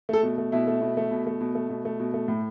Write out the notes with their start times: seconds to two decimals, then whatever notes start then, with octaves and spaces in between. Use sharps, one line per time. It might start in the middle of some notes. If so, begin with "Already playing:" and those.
0.09 A3 A4
0.23 B2
0.38 A3
0.52 B2 E4
0.67 A3
0.82 B2
0.97 A3
1.11 B2
1.27 A3
1.41 B2
1.55 A3
1.70 B2
1.85 A3
2.00 B2
2.14 A3
2.28 A2